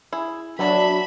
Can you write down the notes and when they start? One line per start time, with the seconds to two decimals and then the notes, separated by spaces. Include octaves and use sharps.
0.12 E4 G#4
0.59 F#3 B3 D4 A4 D5 E5 B5